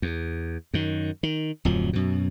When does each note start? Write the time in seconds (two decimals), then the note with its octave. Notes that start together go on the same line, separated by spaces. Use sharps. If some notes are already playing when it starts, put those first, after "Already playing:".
0.02 E2
0.74 F#2 D#3
1.23 D#3
1.65 D1 F2 F3 F#3
1.93 F#2 B2